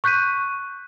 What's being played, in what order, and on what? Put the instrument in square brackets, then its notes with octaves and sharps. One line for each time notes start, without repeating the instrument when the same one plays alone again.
[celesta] C#6 F#6 G6 B6 D#7